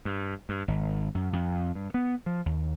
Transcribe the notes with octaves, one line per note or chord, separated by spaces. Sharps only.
G2
G2
G#1
F#2
F2
G2
B3
F3
D#2